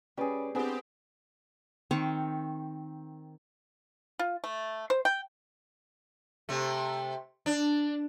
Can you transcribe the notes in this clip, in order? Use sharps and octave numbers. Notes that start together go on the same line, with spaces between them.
G3 C#4 G#4 B4 D5
B3 C4 D4 G4 G#4 B4
D#3 C4 F5 C#6
F4
A3
C5
G5
C3 A3
D4